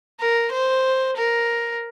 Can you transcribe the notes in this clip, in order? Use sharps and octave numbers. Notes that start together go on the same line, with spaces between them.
A#4
C5
A#4